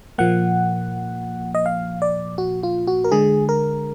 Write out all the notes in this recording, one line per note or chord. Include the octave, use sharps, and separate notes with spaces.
A#2 F3 A#3 F#5
D#5
F5
D5
F#4
F4
F#4
A#4
D3 G#3 G#4
A#4